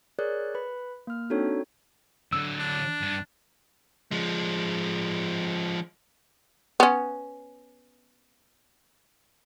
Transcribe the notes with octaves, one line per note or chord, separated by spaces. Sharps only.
G#4 A#4 C#5 D5 F#6
B4 B5
A#3 F6
C4 D4 D#4 F#4 A4 C#5
D3 F#3 E6
D4
G2
F3 G#3
B3 C#4